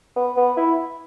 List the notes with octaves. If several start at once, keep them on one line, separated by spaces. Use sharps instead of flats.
B3
B3
E4